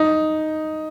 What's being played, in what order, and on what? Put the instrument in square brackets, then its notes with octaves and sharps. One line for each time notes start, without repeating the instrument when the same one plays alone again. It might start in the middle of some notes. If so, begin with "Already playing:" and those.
Already playing: [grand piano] D#4